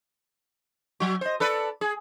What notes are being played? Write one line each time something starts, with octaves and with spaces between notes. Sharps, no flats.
F#3 F#4
C5 D#5
A4 B4 D5
G#4